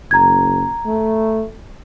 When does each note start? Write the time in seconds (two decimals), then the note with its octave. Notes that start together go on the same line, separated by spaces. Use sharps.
0.11 F#1 A#5 G#6
0.86 A3